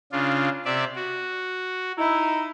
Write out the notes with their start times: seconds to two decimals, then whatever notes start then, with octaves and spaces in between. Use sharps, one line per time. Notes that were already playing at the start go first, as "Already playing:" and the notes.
0.12 C#3 D4 F4
0.65 C3 D5 E5
0.95 F#4
1.98 D#4 E4